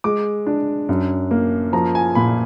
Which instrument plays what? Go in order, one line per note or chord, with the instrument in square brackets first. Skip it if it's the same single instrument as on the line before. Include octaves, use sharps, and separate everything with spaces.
[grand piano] G#3 D6
D4
F#2
A#3
F3 A#5
G#5
A#2 B5